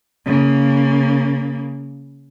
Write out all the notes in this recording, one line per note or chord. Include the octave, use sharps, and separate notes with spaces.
C#3 A#3